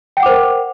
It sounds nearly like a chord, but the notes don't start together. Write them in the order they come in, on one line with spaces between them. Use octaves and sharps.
G5 F#5 D6 C5 A#4